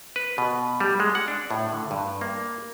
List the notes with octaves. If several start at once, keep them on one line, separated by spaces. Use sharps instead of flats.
B4
B2
G3
G#3
F#5
D4
A2
D3
G2
A#3